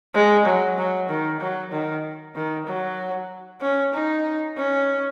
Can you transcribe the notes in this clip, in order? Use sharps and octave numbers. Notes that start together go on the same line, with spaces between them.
G#3
F#3
F#3
D#3
F#3
D#3
D#3
F#3
C#4
D#4
C#4